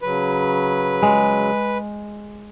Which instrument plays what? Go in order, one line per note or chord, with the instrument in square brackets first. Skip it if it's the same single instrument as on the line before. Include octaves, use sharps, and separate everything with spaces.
[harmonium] C#3 F#3 [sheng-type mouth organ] B4
[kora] G#3